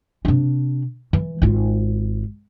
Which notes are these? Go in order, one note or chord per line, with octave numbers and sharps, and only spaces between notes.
C3 D4
E3
G#1 F4